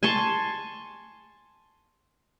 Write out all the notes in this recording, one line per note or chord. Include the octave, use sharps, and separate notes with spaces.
G#5 A5 C6 C#6